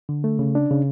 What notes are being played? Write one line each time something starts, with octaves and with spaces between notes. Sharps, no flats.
D3
A3
C#3
D4
C#3